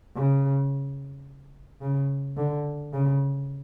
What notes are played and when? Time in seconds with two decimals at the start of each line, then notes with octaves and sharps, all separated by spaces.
0.16 C#3
1.81 C#3
2.37 D3
2.93 C#3